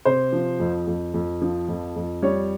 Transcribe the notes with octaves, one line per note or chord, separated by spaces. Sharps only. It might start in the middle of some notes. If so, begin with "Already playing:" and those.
C3 C5
F3
F2
F2
F2
F3
F2
F2
G3 C#5